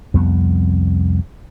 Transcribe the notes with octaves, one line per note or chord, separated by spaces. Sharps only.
C2 F2 B3